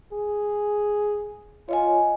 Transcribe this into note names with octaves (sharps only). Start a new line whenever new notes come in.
G#4
F4 C#5 D#5 G#5